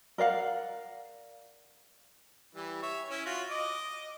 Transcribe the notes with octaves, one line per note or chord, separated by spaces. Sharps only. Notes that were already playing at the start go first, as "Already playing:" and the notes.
A#4 D5 F5 F#5
E3 G3
C#5 E5
C#4 E4
F4 F#4
D#5 D6